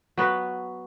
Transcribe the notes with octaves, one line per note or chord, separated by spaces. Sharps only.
F#3 B3 F#4 B4